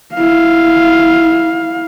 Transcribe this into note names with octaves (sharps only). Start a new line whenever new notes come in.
E4 F5